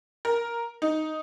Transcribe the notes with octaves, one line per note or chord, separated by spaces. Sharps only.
A#4
D#4